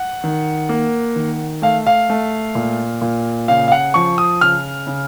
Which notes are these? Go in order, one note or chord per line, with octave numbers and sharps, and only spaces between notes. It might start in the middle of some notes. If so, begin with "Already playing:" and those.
Already playing: F#5
D#3
A#3
D#3
A3 F5
F5
A3
A#2
A#2
C#3 F5
F5
F#5
F3 C#6
D#6
C#3 F6
C#3